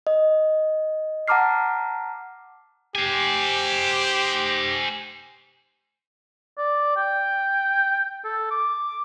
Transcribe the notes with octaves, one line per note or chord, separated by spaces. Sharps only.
D#5
F#5 A5 A#5 D6 F6 C7
G4 C5 G#5
D5
G5
A4
D6